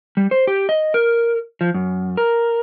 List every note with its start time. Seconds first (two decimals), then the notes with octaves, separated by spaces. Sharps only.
0.17 G3
0.31 C5
0.47 G4
0.69 D#5
0.94 A#4
1.61 F3
1.74 F#2
2.17 A#4